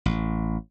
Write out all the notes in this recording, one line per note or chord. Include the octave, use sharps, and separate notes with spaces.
A1